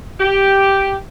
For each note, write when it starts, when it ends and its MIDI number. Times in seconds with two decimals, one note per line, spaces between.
0.20 0.95 67